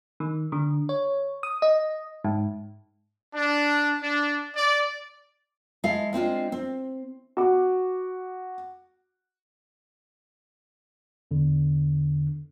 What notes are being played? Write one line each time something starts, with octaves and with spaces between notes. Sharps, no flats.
D#3
D3
C#5
D#6
D#5
G#2
D4
D4
D5
G#3 E4 A4 F5
G#3 C4 D4 F4
C4
F#4 D6
E2 D3